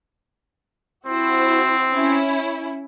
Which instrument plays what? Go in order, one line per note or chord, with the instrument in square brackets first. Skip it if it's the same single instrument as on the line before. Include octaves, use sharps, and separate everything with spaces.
[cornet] C4 [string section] E4 F#4 C5
[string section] C#4 E4